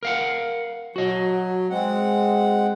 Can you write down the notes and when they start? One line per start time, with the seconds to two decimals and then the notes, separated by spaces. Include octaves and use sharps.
0.03 A#4 F5 F#5
0.96 F#3 F#4 D#5
1.70 G#3 C4 F#5